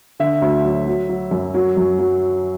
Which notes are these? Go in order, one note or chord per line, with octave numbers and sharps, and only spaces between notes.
D3 E5
D2
F#3
F#3
F#3
F#2
F#3
F#2
F#3